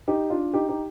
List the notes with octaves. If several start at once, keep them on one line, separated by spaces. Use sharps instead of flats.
D#4 G4
D4 F4
D#4 G4
D#4 G4